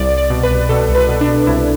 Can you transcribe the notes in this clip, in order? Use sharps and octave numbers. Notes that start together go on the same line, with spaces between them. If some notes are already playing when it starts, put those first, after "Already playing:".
Already playing: C2 D5
C2
D5
B2
B4
C2
B2 A4
C2
B4
B2
D4
B2
C2 E4